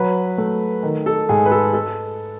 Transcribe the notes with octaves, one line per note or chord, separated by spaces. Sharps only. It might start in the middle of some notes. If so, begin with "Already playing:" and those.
Already playing: F#3 B4
A3
D#3
A4
G#2 G#4
B4
A4
A4